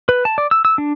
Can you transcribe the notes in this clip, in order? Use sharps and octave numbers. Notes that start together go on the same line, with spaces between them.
B4
A5
D5
E6
E6
D4